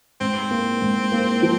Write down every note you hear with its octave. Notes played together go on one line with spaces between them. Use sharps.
G#2 C4
A#3
G#2
A#3
F3